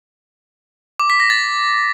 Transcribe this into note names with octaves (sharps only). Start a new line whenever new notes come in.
D6
B6
A#6
A6